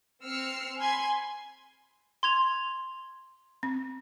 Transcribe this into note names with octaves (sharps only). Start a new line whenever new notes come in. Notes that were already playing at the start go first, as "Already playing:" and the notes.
C4 E6 F6 C7 C#7
G#5 B5 C6 G#6
C6 G#6 F7
C4